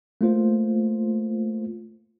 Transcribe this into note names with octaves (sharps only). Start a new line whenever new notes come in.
A3 A#3 F4 C5